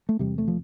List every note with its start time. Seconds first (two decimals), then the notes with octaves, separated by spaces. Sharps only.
0.09 A3
0.19 E2 C3 G3
0.38 A3
0.48 F3